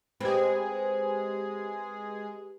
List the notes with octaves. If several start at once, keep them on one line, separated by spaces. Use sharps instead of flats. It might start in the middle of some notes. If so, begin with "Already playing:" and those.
G#3 C4 G4 G#4 B4